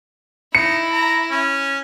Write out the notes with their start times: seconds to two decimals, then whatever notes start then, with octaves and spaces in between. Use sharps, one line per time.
0.55 D#4 E4 C#7
0.91 A#5
1.30 C#4